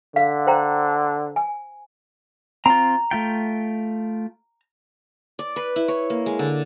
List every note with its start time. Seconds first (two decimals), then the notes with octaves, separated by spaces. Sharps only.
0.16 D3 F5
0.47 C5 G5 A#5
1.36 G#5
2.66 C4 F4 A#5
3.11 A3 F4 G5
5.39 D5
5.56 B4
5.76 E4
5.88 C#5
6.10 A#3
6.26 G#3
6.39 D3